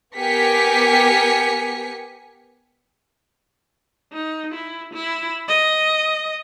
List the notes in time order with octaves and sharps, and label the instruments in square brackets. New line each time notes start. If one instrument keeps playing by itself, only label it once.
[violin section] B3 G4 A#4 G#5 B6 C#7
[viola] D#4
E4
E4
D#5